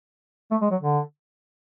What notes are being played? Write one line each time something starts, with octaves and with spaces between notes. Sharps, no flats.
A3
G#3
F#3
D3